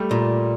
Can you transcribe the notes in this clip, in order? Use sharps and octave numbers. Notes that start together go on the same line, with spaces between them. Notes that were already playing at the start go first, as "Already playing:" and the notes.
Already playing: G3 A3
A#2